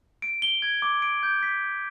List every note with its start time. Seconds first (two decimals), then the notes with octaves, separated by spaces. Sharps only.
0.22 D7
0.42 G7
0.62 G#6
0.82 D6
1.02 D7
1.23 G6
1.43 B6
1.64 G6